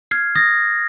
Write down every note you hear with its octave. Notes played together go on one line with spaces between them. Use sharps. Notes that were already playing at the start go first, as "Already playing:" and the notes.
F6 G#6 C7
D#6 A6 A#6